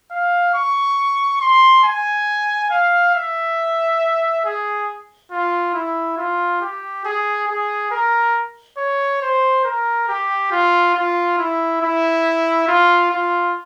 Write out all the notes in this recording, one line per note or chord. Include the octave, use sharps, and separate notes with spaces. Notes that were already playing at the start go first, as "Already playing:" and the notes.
F5
C#6
C6
G#5
F5
E5
G#4
F4
E4
F4
G4
G#4
G#4
A#4
C#5
C5
A#4
G4
F4
F4
E4
E4
F4
F4